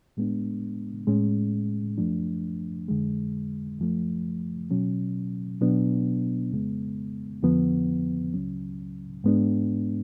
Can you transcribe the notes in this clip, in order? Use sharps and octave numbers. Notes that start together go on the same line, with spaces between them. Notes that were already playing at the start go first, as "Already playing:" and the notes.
A2 G#3 B3 D4
A2 G#3 C#4
F#2 F3 A3 D4
F2 D3 G#3
F#2 F3 A3
B2 F#3 C#4
B2 F#3 B3 D4
F2 C#3 G#3 B3
F2 D3 F3 B3
C#2 C#3 F#3 C#4
G#2 G#3 B3 D4